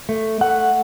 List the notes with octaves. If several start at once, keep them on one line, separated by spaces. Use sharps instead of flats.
A3
A3 F#5